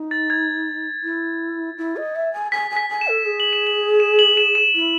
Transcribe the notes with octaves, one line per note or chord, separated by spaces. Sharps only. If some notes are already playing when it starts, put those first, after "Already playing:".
Already playing: D#4
A6
G#6
E4
E4
D#5
E5
G#5
G#5 B6
G#5
B6
G#5
E7
A4
G#4
F#7
E7
F#7
E7
F#7
E7
E7
E4